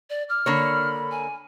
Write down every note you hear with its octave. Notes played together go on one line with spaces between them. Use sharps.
D5
D6 F6
D3 A#3 C#5 B5
G#5